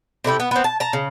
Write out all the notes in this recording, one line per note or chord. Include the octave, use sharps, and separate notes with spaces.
C3 A3 E4 G4
B3
B3 C4
A5
A5 A#5
C#3